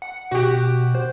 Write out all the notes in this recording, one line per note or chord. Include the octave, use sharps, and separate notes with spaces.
F#5
B2 F#4 G4
C5